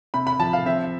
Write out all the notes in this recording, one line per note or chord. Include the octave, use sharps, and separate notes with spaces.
C3 B5
B5
F3 A5
F5
C4 E5